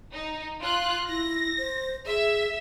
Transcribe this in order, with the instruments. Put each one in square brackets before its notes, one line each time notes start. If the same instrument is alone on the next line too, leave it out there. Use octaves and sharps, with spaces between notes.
[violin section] D#4
F4 F#6
[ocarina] E4 [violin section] A#6
[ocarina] C5
[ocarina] G#4 [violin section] E5